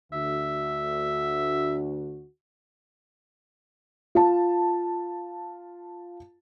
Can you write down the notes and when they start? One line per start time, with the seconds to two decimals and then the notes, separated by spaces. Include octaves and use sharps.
0.13 D2 D3 F#4 E5
4.15 F4 A5